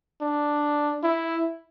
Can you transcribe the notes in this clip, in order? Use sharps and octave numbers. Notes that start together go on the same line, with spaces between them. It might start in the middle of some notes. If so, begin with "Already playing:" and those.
D4
E4